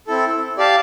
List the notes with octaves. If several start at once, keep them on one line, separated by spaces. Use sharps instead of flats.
C4 E4 A4
G4 D5 F5 A5